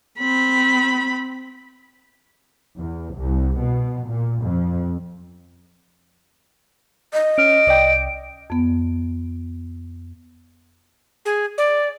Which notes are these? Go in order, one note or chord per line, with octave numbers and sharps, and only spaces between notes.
C4 B5
E2
C2
B2
A#2
F2
D#5
C#4 F6 D7
C2 D5 G5
F2 B3
G#4
D5